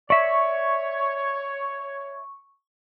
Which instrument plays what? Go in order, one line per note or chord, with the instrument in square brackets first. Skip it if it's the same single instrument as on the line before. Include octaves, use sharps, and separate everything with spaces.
[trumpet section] C#5 [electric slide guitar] D5 E5 [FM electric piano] C#6